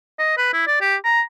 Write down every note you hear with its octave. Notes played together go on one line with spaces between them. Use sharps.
D#5
B4
E4
D5
G4
A#5